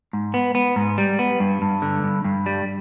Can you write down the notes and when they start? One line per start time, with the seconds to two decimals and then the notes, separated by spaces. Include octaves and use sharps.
0.13 G#2
0.34 B3
0.55 B3
0.76 G#2
0.98 G3
1.19 B3
1.40 G2
1.62 G2
1.82 D3
2.04 G2
2.24 G2
2.46 G3